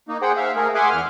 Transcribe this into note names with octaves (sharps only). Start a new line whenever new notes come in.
A#3 D#4
G#4 C5 F#5 G5
E5 F5
A3 G#4 A#4
G#4 E5 F#5 G#5 C6 D6
E2 F6